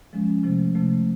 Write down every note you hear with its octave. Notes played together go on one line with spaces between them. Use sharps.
F3 G#3 C#4
C3 F3 A3
C3 F3 A3